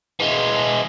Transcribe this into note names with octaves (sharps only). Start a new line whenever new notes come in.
E3 G#3